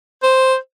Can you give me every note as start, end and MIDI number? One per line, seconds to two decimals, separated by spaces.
0.23 0.57 72